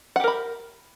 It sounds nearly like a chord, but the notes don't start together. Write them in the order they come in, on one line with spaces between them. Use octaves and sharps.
F#5 G4 A#4 B5